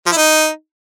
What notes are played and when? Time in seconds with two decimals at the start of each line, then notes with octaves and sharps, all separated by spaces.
0.07 F3
0.12 E4
0.17 D#4